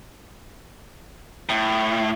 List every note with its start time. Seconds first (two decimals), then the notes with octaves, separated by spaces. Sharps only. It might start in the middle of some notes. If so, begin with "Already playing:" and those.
1.49 A2